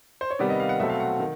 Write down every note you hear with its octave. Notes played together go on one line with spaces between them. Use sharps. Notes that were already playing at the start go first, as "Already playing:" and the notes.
C5
C#5
C3 D#3 G3 B3 D5
D#5
F5
F#5
B2 F#3 A3 C4 E5
F5
F#5
D#3